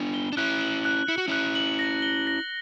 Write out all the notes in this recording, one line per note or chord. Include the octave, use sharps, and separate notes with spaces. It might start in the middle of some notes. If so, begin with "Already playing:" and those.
Already playing: B3 D4
G7
D4
C#4 E4 F#6
F#7
F#6
E4 C#7
F#4
C#4 E4 F#6
F#7
A#6
G7
A#6